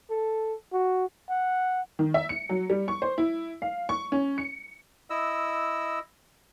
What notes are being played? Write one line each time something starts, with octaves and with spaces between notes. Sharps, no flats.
A4
F#4
F#5
D#3
E5
C#7
F#3
G3
C#6
C5
E4
F5
C#6
C#4
C#7
E4 D#5 E6